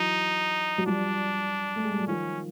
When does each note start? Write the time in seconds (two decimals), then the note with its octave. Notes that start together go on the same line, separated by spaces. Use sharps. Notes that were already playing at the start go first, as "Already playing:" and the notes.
Already playing: E3 F#3 D#4
0.78 F#3
0.86 F3 G3 D4
1.76 A3
1.84 G#3
1.91 G3
2.00 F#3
2.07 D#3 F3 C#4